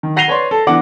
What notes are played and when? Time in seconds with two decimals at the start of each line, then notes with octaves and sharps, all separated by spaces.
0.03 D#3
0.16 F#5 A#6 C7 D#7 F7 G7
0.28 B4 C#5 D5 C6
0.51 A4
0.67 E3 B3 D4 F#5 D6